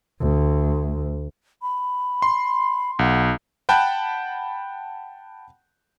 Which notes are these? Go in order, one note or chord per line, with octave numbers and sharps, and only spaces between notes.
D2
B5
C6
B1 F#5
F#5 G5 A5 B5 F#6 G6